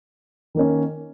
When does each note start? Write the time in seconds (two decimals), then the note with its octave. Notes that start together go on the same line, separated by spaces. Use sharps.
0.55 D#3 A#3 C#4